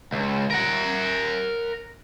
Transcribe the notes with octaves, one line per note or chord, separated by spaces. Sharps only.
C#2
A#4 F#5